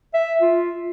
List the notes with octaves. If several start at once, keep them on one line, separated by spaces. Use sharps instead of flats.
E5
F4